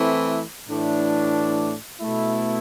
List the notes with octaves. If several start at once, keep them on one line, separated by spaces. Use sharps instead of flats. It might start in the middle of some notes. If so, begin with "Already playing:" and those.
Already playing: E3 A3 C4 E4
A2 E3 A3 D4
B2 A3 E4